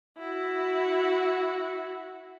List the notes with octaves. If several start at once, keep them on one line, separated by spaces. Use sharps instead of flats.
E4 F#4